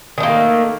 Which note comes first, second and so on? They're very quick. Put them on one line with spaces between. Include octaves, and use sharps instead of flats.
D#3 A3 A#3